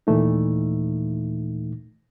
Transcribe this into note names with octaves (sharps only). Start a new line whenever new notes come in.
D#2 A#2 E3 A3 D#4